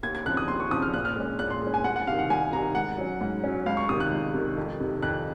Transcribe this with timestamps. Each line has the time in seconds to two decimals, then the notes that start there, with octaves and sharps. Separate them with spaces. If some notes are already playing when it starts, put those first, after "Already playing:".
0.03 D#2 G#6
0.15 G#6
0.25 C#3 F3 C4 F#6
0.37 D#6
0.48 D#2 C6
0.60 C#6
0.71 C#3 F3 C4 D#6
0.82 F6
0.94 A#2 F#6
1.05 F6
1.16 G#3 C#4
1.39 A#2 F#6
1.50 C6
1.62 G#3 C#4
1.74 G#5
1.84 C2 F#5
1.96 F#5
2.07 C3 D#3 F5
2.19 F#5
2.30 C2 G#5
2.52 C3 D#3 A#5
2.75 G#2 F#5
2.98 F#3 C#4
3.21 G#2
3.44 F#3 C#4
3.66 C#2 F5
3.77 C#6
3.89 C3 D#3 D#6
4.00 F#6
4.11 C#2
4.34 C3 D#3
4.57 F2
4.80 C3 D#3
5.02 F2 F#6